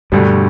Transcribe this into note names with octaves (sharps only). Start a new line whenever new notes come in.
D2 G2 B2 D3 G3